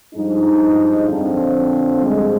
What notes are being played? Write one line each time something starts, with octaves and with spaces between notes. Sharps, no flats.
G2 F3 G#3 D#4
F2 D3 F3 C4
G2 F3 G#3